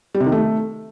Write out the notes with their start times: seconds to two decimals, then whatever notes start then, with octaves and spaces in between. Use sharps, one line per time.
0.14 G3
0.20 C3
0.26 D#3
0.32 A3